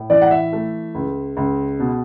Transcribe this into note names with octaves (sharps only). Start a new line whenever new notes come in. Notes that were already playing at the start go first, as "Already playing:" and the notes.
Already playing: A2
E3 D5
F#5
E5
A3
C#2
C#2
B2